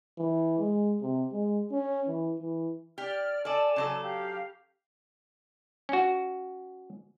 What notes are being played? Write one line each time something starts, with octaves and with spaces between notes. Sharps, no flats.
E3
G#3
C3
G#3
C#4
E3
E3
G4 D5 F6
A4 D5 G#5 A5
C#3 F#3 A4
G4 F5
C#4 F#4